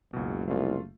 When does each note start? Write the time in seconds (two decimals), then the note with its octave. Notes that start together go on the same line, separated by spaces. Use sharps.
0.13 F#1 C#2 B2
0.48 C2 A3 F4